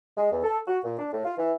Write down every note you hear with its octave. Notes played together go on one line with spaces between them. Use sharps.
G#3
E2
A4
F#4
A#2
D4
A2
F4
E3